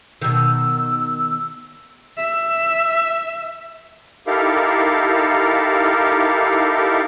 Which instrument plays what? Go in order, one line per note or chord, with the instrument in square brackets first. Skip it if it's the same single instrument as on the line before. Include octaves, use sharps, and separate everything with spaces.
[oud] B2 D#3 [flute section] E6
[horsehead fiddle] E5
[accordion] D#4 E4 G4 A4 A#4 F5